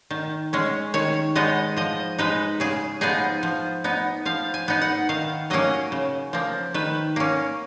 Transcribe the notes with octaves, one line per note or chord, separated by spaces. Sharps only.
D#3
G#3 C#4
D#3 C#5
G#3 B3 D#4 D#5
F3 D#5
G#3 D#4 B4
C#3 G#4
F3 B3 D#4 G#4
F3
B3 D#4
F3 F5
G#5
B3 D#4
F#5
D#3 F5
F#3 A#3 C#4 D#5
C#3
F3 A#3
D#3 B4
A#3 C#4